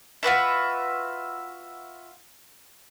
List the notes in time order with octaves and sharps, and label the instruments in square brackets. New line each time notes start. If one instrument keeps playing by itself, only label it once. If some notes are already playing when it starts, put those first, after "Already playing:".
[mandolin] F4 F#4 B4 E5